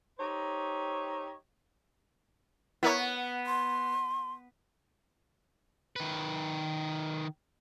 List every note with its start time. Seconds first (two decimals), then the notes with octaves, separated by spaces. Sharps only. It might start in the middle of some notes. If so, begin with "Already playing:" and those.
0.18 D#4 G4 A4 C5 C#5
2.83 B3 E4 A#4 C#5
3.46 C6
5.96 D#3 B4